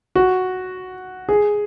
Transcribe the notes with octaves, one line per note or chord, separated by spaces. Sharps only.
F#4
G#4